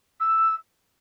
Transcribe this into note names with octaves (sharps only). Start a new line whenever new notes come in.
E6